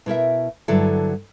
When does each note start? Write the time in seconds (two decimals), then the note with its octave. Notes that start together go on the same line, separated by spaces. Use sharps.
0.06 B2 E4 A#4 E5
0.68 G2 D3 F#3 E4 A4